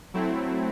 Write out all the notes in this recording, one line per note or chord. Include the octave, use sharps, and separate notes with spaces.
F#3 A3 C4 E4